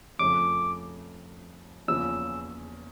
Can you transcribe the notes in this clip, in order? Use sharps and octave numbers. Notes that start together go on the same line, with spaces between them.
F2 C#3 F3 A3 D6
E2 C#3 F3 A#3 C#4 E6